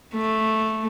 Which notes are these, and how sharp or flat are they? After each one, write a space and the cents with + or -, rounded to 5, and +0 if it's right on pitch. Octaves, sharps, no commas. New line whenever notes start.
A3 -5